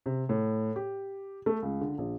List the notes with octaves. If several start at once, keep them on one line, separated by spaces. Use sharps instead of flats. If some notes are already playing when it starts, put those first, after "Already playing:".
C3
A2
G4
A3
C#2
D3
A#1